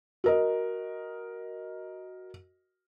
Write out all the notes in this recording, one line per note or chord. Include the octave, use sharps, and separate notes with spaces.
F#4 A#4 D#5